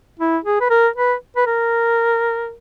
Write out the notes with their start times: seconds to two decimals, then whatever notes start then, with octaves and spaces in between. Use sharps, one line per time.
0.20 E4
0.44 G#4
0.61 B4
0.70 A#4
0.96 B4
1.37 B4
1.47 A#4